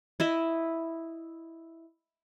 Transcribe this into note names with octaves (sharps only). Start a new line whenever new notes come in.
E4 D#5 E5